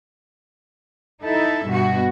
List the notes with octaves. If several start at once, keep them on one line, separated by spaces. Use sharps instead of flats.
D#4 E4 A4 E5
G2 B2 F#4